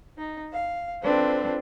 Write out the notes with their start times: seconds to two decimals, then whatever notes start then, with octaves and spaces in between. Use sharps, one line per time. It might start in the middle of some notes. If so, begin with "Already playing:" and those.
0.17 D#4
0.52 F5
1.03 C4 D4 F4 A4 B4 C5